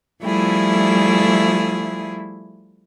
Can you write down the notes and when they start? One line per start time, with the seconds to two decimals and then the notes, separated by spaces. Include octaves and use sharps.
0.24 F3 G3 A3 E4 G#4